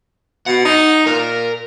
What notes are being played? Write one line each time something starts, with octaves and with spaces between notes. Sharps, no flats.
B2 F#5
D#4
A#2 A#4